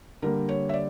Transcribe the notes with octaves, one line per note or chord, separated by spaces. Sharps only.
D3 G3 A#3 A#4
C#5
E5
D5